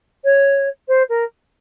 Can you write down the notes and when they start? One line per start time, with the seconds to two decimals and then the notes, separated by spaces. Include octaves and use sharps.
0.24 C#5
0.88 C5
1.09 A#4